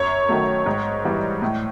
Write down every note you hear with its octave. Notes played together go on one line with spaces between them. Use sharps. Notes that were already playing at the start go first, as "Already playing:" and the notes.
Already playing: F#2 C#5
D#3 F#3 A3
G#2
E3 G3
A2